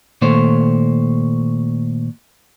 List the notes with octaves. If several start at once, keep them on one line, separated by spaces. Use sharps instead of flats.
A#2 D#3 A3 C5 C#5